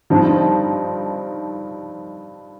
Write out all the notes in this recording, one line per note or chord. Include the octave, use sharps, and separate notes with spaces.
G2 F3 C4 D#4